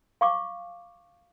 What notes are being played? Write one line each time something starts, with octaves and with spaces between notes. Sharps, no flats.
F5 C#6 D6